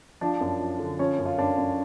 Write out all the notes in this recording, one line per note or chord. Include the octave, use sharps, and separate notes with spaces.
F3 D4
F#2
F3
D3
F3 C#4
F#2
F4
F#2 D4
F#2